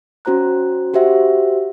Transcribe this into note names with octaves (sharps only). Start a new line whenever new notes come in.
C#4 F#4 C5 A#5 F#6
F#4 G4 C5 E5 F#5